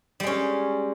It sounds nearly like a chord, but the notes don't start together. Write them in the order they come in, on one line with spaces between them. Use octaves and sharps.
G3 G#3 C#4